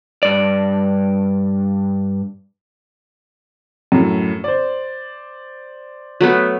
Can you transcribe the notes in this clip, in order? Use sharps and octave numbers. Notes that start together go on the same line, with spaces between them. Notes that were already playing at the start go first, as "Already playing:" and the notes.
G2 D5
F#2 A2
C5 D5
F#3 A3 B3